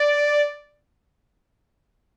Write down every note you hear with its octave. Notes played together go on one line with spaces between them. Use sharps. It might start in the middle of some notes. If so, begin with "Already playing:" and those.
Already playing: D5